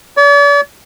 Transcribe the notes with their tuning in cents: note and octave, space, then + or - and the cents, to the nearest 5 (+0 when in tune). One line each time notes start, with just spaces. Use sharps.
D5 -45